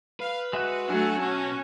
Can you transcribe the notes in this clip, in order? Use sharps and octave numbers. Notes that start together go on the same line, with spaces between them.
B4 F5
G#3 F#4 E5 F#6
F#3 A3 D4 E5 G#5
B2 C#4 F#4 A5